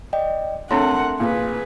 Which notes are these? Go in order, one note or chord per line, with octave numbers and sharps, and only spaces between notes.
D5 D#5 G5
A3 C4 D4 A#4 C#5 F#5 C6
A#2 G#4 B4